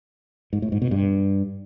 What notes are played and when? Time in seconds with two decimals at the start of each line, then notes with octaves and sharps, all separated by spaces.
0.53 G#2
0.62 A2
0.72 G#2
0.82 B2
0.91 G2